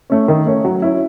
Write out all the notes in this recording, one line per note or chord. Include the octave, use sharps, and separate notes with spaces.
A3 C#4
D#3
A3 C#4
F#3
C#4 E4